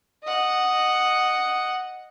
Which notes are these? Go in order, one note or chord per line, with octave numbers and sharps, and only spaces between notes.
D#5 F#5